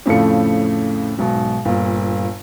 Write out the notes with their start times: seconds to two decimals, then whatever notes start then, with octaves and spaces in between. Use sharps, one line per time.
0.06 F2 A2 C#3 F3 A3 C#7
1.18 B1 G#2 B2
1.65 G1 A#2